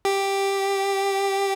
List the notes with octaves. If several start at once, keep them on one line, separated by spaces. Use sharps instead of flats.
G4